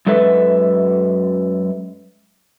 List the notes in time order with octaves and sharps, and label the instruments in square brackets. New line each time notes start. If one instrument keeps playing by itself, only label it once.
[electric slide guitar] F#2 G#3 A4 B4 E5